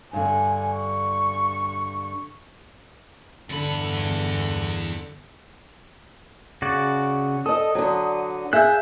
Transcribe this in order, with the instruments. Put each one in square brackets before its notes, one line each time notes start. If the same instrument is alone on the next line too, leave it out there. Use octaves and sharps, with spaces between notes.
[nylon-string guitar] G2 D3 [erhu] G#5
[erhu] C#6
[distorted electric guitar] E2 B5 [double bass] G2 D3
[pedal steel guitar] C#3 F#4 D5
[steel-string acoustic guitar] A4 D#5 [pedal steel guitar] D#6
[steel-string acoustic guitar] D3 F#3
[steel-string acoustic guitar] G#4 E5 F5 [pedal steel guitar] F#6 G6